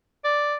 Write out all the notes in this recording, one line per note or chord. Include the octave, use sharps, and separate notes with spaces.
D5